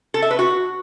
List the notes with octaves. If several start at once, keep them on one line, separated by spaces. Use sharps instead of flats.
A4
E5
B4
F#4